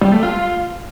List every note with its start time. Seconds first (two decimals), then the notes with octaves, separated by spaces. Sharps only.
0.01 G3
0.12 A3
0.23 F4